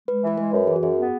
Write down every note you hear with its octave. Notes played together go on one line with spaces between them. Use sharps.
G#3 B4
E3 B4
G#3 B4
F#2
E3 G#4
F#4
F#2 G#4
B3